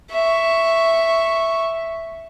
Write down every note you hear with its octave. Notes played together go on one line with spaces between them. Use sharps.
E5 C#6